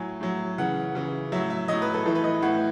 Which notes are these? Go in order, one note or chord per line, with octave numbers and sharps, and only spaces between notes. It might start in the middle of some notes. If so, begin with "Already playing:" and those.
Already playing: A2 F#3 G#5
A2 F#3
C#3 E3 F#5
C#3 E3
A2 F#3 E5
E5
A2 F#3 D#5
B4
A4
A2 E3 A4
B4
D#5
A2 E3 F#5